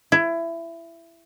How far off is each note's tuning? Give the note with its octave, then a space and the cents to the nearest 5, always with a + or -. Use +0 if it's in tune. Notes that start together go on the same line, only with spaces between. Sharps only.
E4 +20